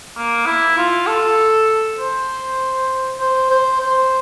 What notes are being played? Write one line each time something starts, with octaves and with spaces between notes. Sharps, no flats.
A#3
E4
F4
A4
C5
C5
C5
C5